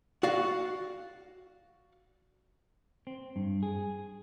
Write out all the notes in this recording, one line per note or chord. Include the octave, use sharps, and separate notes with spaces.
F#4 D5 F5 F#5
C4
G2
G#4